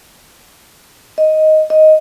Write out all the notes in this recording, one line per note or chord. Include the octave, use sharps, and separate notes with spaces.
D#5
D#5